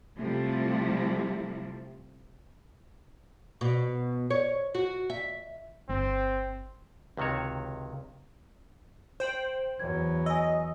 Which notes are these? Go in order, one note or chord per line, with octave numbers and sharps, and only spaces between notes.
C3 F3 G3 A3 E4
B2
C#5
F#4
E5
G1 C4
C#2 C3 D#3 F#4 C#5
C5 G5 G6 F#7
E2 F#3 G#6
D#5 G#5 E6